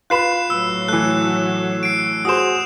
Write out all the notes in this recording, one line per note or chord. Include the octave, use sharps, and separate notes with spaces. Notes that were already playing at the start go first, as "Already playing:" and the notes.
F4 B4 B5 F#6 C7 E7
A2 F#3 E6
E3 A3 F#6
C7 D7
F#4 G#4 C5 D#6 E7